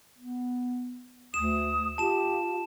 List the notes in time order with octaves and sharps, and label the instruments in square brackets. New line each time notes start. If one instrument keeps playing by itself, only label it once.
[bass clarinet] B3
[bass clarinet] D2 [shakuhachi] D#6 [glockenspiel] E7
[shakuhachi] F4 [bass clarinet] G4 [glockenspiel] A5 E7